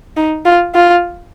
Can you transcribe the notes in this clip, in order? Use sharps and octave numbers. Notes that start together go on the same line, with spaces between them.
D#4
F4
F4